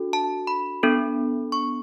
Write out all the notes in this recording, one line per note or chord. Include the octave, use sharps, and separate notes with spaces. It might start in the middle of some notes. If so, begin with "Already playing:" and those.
Already playing: D4 F#4 A4
A5
B5
B3 D4 A4
C#6